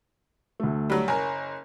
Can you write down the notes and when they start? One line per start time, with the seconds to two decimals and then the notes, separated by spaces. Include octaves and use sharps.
0.60 D2 A3
0.90 F#3 G3
1.08 F#1 A#4 C#5 G#5